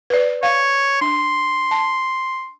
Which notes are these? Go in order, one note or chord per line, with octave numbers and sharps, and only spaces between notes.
B4 D5
C#5 F5
D4 C6
A5